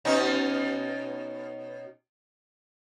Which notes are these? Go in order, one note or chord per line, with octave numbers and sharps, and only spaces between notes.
B2 C#4 D#4